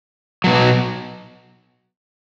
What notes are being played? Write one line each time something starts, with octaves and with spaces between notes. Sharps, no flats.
B2 F#3